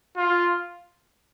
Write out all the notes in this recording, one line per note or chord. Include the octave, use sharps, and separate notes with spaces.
F4